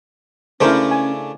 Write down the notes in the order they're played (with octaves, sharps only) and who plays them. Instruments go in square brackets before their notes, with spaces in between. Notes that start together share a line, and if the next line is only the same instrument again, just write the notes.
[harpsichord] C#3 A3 D4 [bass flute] C#4 [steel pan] E4 A#4 C5
[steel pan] G#5